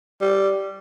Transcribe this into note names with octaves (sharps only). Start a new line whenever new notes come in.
G3